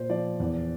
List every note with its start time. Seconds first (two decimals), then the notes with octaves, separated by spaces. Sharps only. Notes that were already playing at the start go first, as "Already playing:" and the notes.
Already playing: A#2 C5
0.10 F3 D5
0.40 E2